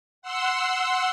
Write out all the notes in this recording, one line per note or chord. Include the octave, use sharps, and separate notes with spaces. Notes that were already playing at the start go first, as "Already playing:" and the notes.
F#5 C6 E6